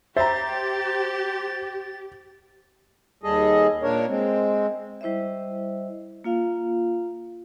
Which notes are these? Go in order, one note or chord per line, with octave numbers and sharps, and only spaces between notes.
G4 C5 E5 A#5 A6
D#2 G3 G#4 A4 D#5
A#2 A#3 D4 A#4 C#5
G#3 C4
G3 E4 C5 D#5 E5
A#3 F4 F5